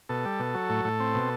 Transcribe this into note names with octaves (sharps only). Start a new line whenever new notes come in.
B2 A4
G3
B2
F#3
A2
A2
C4
B2